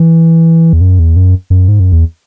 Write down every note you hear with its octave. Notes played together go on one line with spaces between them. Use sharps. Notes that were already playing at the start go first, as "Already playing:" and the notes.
Already playing: E3
E2
F#2
E2
F#2
F#2
G#2
F#2
E2